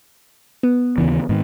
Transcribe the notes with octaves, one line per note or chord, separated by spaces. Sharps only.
B3
D#2 C#3 E3
G#2 D#3